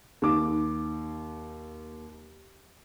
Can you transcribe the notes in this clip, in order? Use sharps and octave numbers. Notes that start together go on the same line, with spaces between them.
D#2 D6